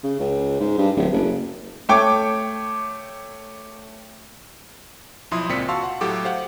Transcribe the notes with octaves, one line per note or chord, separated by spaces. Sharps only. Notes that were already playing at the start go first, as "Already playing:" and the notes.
C#3
C#2
G#2
G2
D1
F#1
A3 C#5 G5 D6
B1 F3 E4 C6 D#6
C#2 A#2 C4 D5 B6 C#7
F#4 F5 A5 C6 C#6 E6
F#5
A2 F#3 G4 A4 D6
G4 C5 F5 F#5